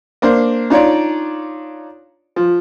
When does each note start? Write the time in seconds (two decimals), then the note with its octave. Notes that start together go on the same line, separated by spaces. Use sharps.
0.22 A#3 D4 C5
0.70 D4 D#4 F4 C#5 D5
2.36 F3